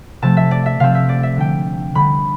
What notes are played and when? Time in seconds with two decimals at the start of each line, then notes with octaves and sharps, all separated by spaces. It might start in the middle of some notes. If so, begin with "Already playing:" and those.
0.22 C3 F3 A3 C4 A5
0.37 E5
0.51 D5
0.66 E5
0.80 C3 F3 A3 C4 F5
0.95 E5
1.09 D5
1.23 E5
1.36 D3 G3 D4 G5
1.95 D3 G3 D4 B5